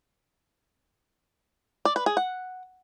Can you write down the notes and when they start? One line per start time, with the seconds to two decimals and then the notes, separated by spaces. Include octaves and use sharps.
1.85 D5
1.96 B4
2.06 G#4
2.17 F#5